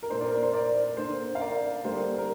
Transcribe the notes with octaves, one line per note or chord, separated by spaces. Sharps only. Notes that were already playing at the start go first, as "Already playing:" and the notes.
A#4
A#2 A#3 D4 C5
A#4 D5
A#4
C5
A#4 D5
D3 A#3 D4 C5
F5
A#4 D5
D3 G3 A#3 D4 C5
A#4